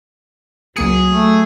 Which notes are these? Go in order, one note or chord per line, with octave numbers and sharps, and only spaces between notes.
C#2 F#3 A#3 G#4 C#7
A3